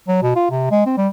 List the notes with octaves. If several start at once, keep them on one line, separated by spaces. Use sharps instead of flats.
F#3
B2
F4
C3
G#3
C4
G3